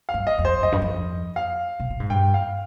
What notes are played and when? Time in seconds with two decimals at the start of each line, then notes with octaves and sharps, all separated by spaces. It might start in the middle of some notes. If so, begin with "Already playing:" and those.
0.09 F5
0.14 G2
0.27 D#5
0.39 F2
0.45 C5
0.63 F2 D#5
0.72 G2
0.82 F2
1.36 F5
1.80 C3
1.90 A#2
2.00 G#2
2.09 G2 G5
2.34 F5